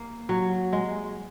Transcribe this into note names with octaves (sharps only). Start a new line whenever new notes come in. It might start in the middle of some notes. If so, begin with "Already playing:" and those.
Already playing: A#3
F#3
G#3